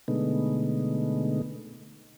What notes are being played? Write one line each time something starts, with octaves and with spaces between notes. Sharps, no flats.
B2 D3 G#3 A3 B3 D#4